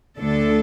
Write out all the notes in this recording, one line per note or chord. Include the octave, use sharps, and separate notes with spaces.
D2 D3 A3 D4 A4